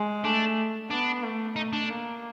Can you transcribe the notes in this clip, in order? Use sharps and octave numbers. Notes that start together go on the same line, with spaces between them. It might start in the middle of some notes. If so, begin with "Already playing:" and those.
Already playing: G#3
A3 D4
B3 D4
A3
A3 D#4
D4
A#3